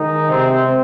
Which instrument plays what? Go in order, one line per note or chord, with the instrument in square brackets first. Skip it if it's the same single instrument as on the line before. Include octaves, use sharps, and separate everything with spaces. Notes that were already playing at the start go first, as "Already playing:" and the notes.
Already playing: [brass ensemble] D#3 G#3 D#4
C3 C4